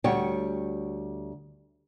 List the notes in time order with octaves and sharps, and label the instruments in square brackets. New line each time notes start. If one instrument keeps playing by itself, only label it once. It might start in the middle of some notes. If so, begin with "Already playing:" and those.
[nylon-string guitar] D2 G3 C#5 F#5 G5